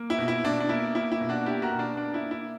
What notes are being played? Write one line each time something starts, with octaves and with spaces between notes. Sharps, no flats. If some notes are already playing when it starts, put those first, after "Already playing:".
Already playing: A#3
E4
B2
E4
B2 D4
D4
A#3 E4
A#3 E4
E4
B2
D4 F#4
A#3 E4 G4
F#4 A#4
B2
D4
A#3 D4
E4
A#3
E4